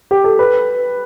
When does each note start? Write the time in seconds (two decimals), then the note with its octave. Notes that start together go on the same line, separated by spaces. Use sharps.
0.11 G4
0.24 A4
0.39 B4